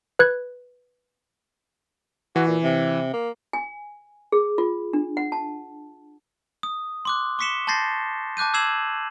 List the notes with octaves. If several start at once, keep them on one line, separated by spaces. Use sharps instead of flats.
B4 F#6 G#6
E3 F#4
A#2
C3
A#3
G#5
G#4
F4
D4
F#5
A5
D#6
C6 D6 F#6
C#6 D6 B6 C#7 E7 G7
A5 C6 G6 A6 A#6 C7
A5 D6 F#6 G6 D#7
D6 E6 G#6 C7 E7 F#7